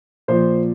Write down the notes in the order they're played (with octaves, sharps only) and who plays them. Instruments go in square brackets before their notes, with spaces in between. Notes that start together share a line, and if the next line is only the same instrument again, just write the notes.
[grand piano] A#2 F3 C5